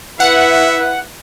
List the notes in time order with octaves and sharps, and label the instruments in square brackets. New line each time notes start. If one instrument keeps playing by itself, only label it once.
[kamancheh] E4 B4 [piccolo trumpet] E5 [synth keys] F#5